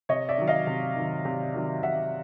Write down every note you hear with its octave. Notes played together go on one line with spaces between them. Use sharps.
C3 C#5 D#5
D5 E5
D#3 F#3
D#5 F5
C3
D#3 F#3
C3
D#3 F#3
C3 E5 F#5